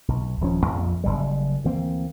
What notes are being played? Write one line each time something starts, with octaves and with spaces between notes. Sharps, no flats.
B1
D#1 F3 C#4
A#1 F2
F#1 C2 G3
D2 E3 A#3 C4